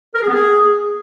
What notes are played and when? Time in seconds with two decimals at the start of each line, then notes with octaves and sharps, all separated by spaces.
0.15 A#4
0.21 G#4
0.28 B3
0.34 G#4